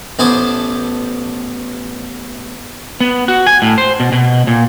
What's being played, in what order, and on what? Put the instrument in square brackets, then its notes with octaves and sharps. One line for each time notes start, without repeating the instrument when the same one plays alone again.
[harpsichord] A1 B3 C5 G#5 A5 D6
[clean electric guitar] B3
F#4
G#5
A2
C5
B2
B2
A#2